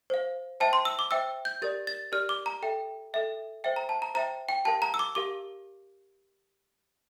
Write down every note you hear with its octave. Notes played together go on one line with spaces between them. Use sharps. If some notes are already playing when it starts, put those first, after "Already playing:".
C5 F5
C5 E5 G5 A5
C6
E6
D6
C5 E5 G5 E6
G6
G4 A#4 D5 A6
A6
G4 A#4 D5 F6
D6
A#5
A4 E5 G5
A4 E5 G5
C5 E5 G5
A#5
A5
A#5
C5 E5 G5 A#5
G5
G4 A#4 F5 A5
A#5
E6
D6
G4 A#4 F5 D6